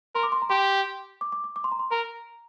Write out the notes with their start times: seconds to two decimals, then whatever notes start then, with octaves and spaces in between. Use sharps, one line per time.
0.15 A#4 C6
0.23 D6
0.32 C6
0.42 A#5
0.49 G4 C6
1.21 D6
1.32 D6
1.44 D6
1.56 D6
1.64 C6
1.72 A#5
1.79 C6
1.91 A#4 A#5